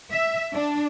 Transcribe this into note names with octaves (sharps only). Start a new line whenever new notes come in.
E5
D4